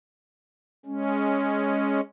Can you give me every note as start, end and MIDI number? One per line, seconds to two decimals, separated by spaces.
0.86 2.01 56
0.86 2.01 61